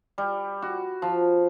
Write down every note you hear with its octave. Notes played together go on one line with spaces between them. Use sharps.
G3
F#4
F3